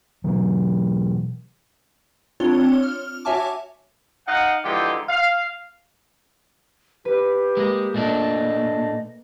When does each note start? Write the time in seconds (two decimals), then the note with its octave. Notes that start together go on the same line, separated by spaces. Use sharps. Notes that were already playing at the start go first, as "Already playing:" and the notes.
0.24 B2 E3 F#3
2.40 C4 D4 F4 C#5 G7
2.83 F6
3.25 F#4 C#5 E5 G#5 A5 D6
4.27 D#4 D#5 F5 F#5
4.64 D3 E3 F3 G#3 D#4 G4
5.09 F5
7.05 G4 B4
7.57 G#3 A#3 A#6
7.94 A#2 A3 D4 D#5